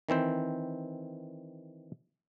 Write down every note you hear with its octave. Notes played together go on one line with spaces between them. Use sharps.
D#3 E3 C4 C5